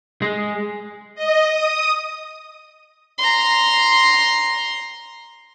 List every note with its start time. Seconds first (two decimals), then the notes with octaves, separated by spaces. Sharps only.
0.22 G#3
1.15 D#5
1.46 D#6
3.18 A#5 C6